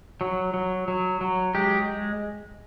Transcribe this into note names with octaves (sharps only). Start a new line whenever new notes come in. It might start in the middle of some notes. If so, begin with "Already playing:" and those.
F#3
F#3
F#3
F#3
G#3 G4